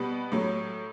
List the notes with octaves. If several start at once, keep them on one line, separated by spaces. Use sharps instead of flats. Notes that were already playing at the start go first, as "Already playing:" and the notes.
Already playing: B2 G3 B3
A2 F#3